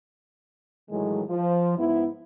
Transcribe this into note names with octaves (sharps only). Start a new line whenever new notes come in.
A2 D#3 E3 F#3 G#3
F3
G#2 B3 E4